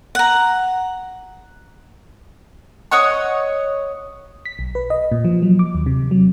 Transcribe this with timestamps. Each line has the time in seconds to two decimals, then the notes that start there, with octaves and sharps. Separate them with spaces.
0.15 F#5 A#5
2.91 C#5 D#5 F#5 C#6
4.45 B6
4.59 B1
4.75 B4
4.90 D#5
5.12 A#2
5.25 F3
5.43 F#3
5.59 D6
5.75 D#2
5.86 C3
6.11 F#3